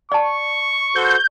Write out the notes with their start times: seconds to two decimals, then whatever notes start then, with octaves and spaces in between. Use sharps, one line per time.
0.12 D5 A5 C#6
0.96 F#4 A4 C5 G6